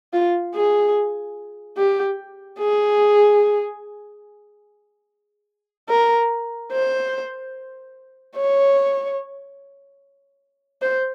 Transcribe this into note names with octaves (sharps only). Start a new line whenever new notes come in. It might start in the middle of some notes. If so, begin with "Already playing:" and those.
F4
G#4
G4
G#4
A#4
C5
C#5
C5